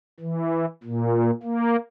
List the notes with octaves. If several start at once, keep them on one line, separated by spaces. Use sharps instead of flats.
E3
A#2
A#3